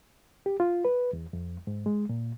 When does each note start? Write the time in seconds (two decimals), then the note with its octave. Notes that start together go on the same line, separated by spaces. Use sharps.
0.46 G4
0.60 F4
0.85 B4
1.13 E2
1.33 F2
1.67 G#2
1.86 G#3
2.09 A#2